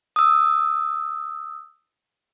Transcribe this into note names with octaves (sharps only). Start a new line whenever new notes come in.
D#6 E6